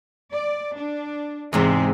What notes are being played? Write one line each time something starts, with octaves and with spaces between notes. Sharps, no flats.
D5
D4
E2 G#2 C3 G#3 C4 G#4